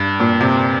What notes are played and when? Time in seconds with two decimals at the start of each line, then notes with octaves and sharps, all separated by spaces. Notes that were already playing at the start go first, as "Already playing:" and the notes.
Already playing: G2
0.20 A#2
0.41 C3